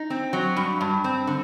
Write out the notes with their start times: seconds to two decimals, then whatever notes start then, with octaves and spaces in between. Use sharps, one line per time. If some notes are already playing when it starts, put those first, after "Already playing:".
Already playing: D#4
0.10 C4
0.33 F#3
0.57 G2
0.81 G2
1.04 C4
1.27 D3